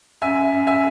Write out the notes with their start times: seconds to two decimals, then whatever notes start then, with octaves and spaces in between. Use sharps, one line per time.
0.21 F#2 E5 G#5
0.52 F#2
0.67 E5 G#5